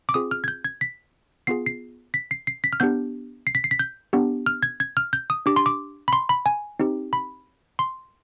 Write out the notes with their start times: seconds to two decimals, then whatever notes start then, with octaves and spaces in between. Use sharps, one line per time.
0.09 D6
0.14 C4 F4 G#4 D#6
0.31 F6
0.44 G#6
0.48 G6
0.65 G#6
0.81 B6
1.47 B3 F4 G#4 C7
1.66 C7
2.14 B6
2.31 C7
2.47 C7
2.64 B6
2.73 F6
2.80 B3 D4 G4 G6
3.47 C7
3.55 B6
3.64 C7
3.71 B6
3.79 G6
4.13 B3 D4 G4
4.46 F6
4.63 G#6
4.80 G#6
4.97 F6
5.13 G6
5.30 D#6
5.46 D4 G4 D6
5.56 C6
5.66 D6
6.08 B5
6.13 C6
6.29 B5
6.46 G#5
6.80 C4 D#4 G4
7.13 B5
7.79 C6